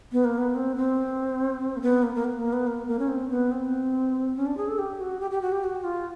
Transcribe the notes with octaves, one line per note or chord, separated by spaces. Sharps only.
B3
A#3
B3
C4
C4
A#3
B3
A#3
A#3
B3
A#3
B3
A#3
A#3
C#4
C4
B3
C4
C#4
D4
G#4
A4
G4
F#4
G4
G4
F#4
G4
F#4
F4